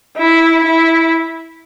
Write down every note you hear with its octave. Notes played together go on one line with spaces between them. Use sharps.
E4
E4